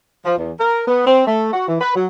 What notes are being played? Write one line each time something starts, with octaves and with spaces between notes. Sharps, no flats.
F3
E2
A#4
B3
C4
A3
F#4
E3
B4
F#3